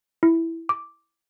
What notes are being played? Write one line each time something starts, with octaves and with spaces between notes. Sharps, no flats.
E4
D6